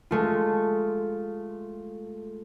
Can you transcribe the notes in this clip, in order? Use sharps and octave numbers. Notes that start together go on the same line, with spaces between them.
G#3 A3 F4